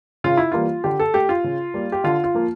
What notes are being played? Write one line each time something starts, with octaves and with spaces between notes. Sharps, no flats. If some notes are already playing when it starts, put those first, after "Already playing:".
C#3 F4
E4
E3 G3 A#3 F4
D3 G4
A4
A3 G4
F4
C#3
G3 A#3
G4
D3 F4
F4
F3 A#3